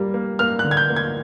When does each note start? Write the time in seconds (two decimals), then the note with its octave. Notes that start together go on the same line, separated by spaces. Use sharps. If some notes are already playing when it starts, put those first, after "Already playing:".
Already playing: G3 A#3
0.14 A#3
0.39 A#3 F6
0.59 F#6
0.64 D3
0.71 G#6
0.77 G6
0.90 A#3
0.96 G#6